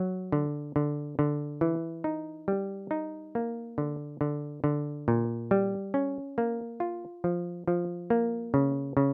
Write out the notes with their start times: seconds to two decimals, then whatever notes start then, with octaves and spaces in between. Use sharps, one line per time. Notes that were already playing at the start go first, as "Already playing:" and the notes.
Already playing: F#3
0.32 D3
0.76 D3
1.19 D3
1.61 E3
2.04 D#4
2.48 G3
2.91 D#4
3.35 A#3
3.78 D3
4.21 D3
4.64 D3
5.08 A#2
5.51 G3
5.94 C#4
6.38 A#3
6.80 F4
7.24 F3
7.68 F3
8.10 A#3
8.54 C#3
8.97 C#3